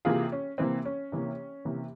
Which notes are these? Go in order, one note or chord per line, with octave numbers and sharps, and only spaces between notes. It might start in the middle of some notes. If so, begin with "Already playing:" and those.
C3 E3 A#3 F4 G#4
C#4
C3 E3 A#3 C4
C#4
C3 E3 A#3
C3 E3 A#3